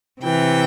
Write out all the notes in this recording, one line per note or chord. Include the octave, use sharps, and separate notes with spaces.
C3 E3 G5